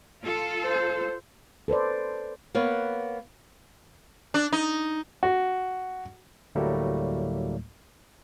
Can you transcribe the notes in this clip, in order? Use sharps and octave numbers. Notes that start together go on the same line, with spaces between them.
F4 A4
C5
A4 B4 C5 D5
A#3 B3 B4 C#5
D4
D#4
F#4
D2 A2 F#3 G3 A3 A#3